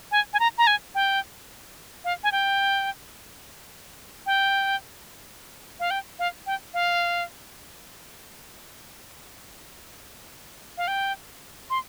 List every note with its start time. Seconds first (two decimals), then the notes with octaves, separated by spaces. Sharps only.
0.11 G#5
0.33 G#5
0.40 A#5
0.58 A#5
0.67 G#5
0.95 G5
2.05 F5
2.23 G#5
2.32 G5
4.26 G5
5.80 F5
5.91 G5
6.19 F5
6.47 G5
6.74 F5
10.78 F5
10.88 G5
11.70 C6